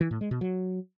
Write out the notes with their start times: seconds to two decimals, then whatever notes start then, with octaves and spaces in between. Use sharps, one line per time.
0.01 E3
0.11 A2
0.21 G#3
0.31 B2
0.41 F#3